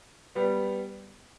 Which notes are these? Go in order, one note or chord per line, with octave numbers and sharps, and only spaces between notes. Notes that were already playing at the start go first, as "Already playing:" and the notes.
G3 B3